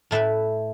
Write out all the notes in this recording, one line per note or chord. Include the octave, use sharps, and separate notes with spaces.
A2 A3 E4 B4